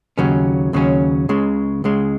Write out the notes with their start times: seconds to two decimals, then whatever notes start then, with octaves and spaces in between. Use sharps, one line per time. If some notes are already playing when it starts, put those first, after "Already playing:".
0.18 D#2 C#3 F#3 C#4
0.73 D#2 C#3 F#3 C#4
1.29 C#2 C#3 G#3
1.84 C#2 C#3 G#3